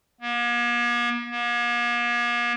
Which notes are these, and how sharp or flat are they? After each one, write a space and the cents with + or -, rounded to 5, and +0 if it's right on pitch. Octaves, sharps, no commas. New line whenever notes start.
A#3 +45
A#3 +45